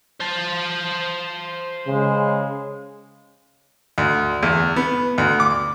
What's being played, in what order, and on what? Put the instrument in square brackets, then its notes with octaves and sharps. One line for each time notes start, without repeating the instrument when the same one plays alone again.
[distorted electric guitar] C5 A5
[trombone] C#3 [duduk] G#3
[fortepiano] D2
E2
B3
D2
D6